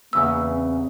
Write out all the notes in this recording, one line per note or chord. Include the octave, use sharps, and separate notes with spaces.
E2 C#3 A#3 B4 E6
C4